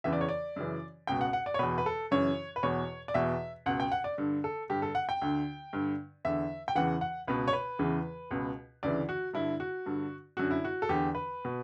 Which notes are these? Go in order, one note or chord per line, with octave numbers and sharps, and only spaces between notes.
E2 C#3 E3 E5
D5
C#5
D5
F#2 C#3 E3
C#2 B2 G5
F#5
F#5
D5
C#5
E2 B2 B4
B4
A4
F#2 C#3 E3 C#5
B4
E2 B2 C#5
D5
E2 B2 E5
C#2 B2 F#5
G5
F#5
D5
G2 D3
A4
G2 D3 G4
A4
F#5
G5
D2 D3
G2 D3
E2 D3 E5
G5
E2 C#3 E3 F#5
F#5
C#2 B2 B4
C#5
B4
E2 C#3 E3
C#2 B2
D2 C#3 E3 D5
F#4
G2 D3 E4
F#4
G2 D3
F#2 D3 F#4
E4
F#4
A4
E2 D3 G4
B4
B2